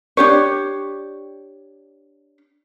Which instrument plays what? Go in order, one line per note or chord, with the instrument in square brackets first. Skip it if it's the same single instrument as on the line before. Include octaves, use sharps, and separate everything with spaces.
[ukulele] D4 G4 C#5